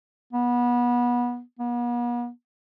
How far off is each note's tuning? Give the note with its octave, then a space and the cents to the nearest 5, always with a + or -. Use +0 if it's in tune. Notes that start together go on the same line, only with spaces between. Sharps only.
B3 -25
B3 -45